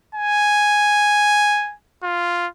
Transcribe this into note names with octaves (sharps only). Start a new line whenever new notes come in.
G#5
F4